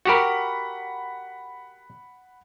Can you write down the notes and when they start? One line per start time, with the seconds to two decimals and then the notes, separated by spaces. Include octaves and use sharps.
0.05 F#4 G4 A#4 F#5 B5